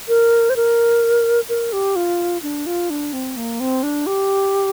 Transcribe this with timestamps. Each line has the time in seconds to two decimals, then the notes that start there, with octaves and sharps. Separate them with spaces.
0.08 A#4
0.50 C5
0.56 A#4
1.49 A#4
1.73 G4
1.96 F4
2.43 D4
2.66 F4
2.90 D4
3.13 C4
3.37 A#3
3.60 C4
3.83 D4
4.07 G4